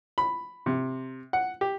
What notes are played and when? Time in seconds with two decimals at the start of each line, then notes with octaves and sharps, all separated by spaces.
0.18 B5
0.66 C3
1.33 F#5
1.61 G4